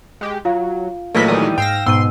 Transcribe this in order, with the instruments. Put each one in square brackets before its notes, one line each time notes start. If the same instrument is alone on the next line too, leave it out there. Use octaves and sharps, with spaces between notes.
[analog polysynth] G#3 G4
[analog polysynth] F#3 [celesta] F4 F5
[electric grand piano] A#2 F#3 A3 [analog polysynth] E3 E4 [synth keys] A#3 D#5 B6
[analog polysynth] D#3 E3 G3 [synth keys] D#6
[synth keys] G#2 [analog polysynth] F5 E6 A#6 [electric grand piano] G5
[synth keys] G#2 B2 [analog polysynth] C6 [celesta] E6 D#7